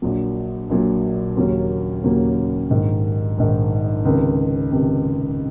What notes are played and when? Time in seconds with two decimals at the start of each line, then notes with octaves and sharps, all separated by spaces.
0.02 A#1 A#2 F#3
0.69 A#1 A#2 F#3
1.36 D#2 C#3 F#3 A#3 C#4
2.04 D#2 C#3 F#3 A#3 C#4
2.70 A#1 G#2 D#3
3.38 A#1 G#2 D#3
4.05 C#2 C3 D#3
4.72 C#2 C3 D#3